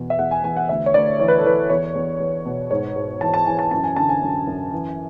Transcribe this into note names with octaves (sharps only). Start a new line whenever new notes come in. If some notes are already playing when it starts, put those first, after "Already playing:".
Already playing: E2 B2
E5
E2 F#5
G#5
E2 G#5
F#5
D2 E5
C#5
D2 D5
E3 C#5
B4
A4
E3 B4
E2 C#5
E2
E2
B2
G#2 C#5
G#2
E3 A5
A5
E3 G#5
A5
F#2 A5
G#5
D3 A5
G#5
F#2
F#2
E3